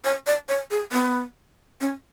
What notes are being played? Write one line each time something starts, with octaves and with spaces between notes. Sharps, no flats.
C#5
D5
C#5
G#4
B3
C#4